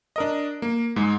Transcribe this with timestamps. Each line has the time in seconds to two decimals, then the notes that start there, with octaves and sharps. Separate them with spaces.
0.16 D4 A#4 D#5
0.62 A#3
0.96 G#2 G#3